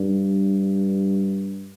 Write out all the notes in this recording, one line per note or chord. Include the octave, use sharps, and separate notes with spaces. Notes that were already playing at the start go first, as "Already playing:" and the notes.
Already playing: G2